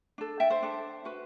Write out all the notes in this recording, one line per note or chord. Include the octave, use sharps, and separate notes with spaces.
D4 A4
E5 G5
C5
D4 A4
F#4 B4